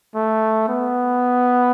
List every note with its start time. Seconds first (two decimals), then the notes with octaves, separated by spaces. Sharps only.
0.15 A3
0.69 B3